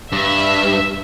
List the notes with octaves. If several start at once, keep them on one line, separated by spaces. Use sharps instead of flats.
G2 E5